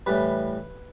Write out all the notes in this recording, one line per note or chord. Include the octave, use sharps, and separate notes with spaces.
A2 E3 G3 B4